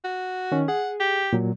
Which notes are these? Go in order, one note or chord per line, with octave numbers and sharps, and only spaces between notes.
F#4
D#3 C#4
G#4 F#5
G4
A#2 F#3